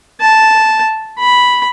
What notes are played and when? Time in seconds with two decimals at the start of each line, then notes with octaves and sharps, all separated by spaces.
0.21 A5
1.19 B5